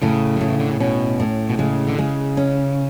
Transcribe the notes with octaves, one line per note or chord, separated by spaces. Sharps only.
A2 C#3
A2 F#3
E3
D3
C#3
B2 C#4
A2
B2
C#3 G#3
D3
C#3 G#3
C#4